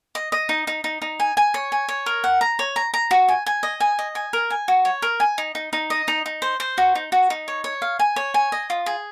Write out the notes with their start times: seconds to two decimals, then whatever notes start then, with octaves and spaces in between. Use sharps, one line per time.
0.15 D#5
0.32 D#5
0.49 D#4
0.67 D#4
0.84 D#4
1.02 D#4
1.20 G#5
1.37 G#5
1.54 C#5
1.72 G#5
1.88 C#5
2.06 A#4
2.24 F#5
2.41 A#5
2.59 C#5
2.76 A#5
2.94 A#5
3.11 F#4
3.28 G#5
3.46 G#5
3.63 D#5
3.80 G#5
3.99 D#5
4.15 G#5
4.33 A#4
4.50 G#5
4.68 F#4
4.85 C#5
5.02 A#4
5.20 G#5
5.38 D#4
5.55 D#4
5.73 D#4
5.90 D#5
6.08 D#4
6.26 D#4
6.42 C5
6.60 C5
6.78 F#4
6.95 D#4
7.12 F#4
7.30 D#4
7.48 C#5
7.64 C#5
7.82 F5
7.99 G#5
8.16 C#5
8.34 G#5
8.52 D#5
8.70 F4
8.86 G#4